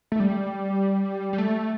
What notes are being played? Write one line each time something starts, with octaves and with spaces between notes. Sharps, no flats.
A3
G3
G3
A3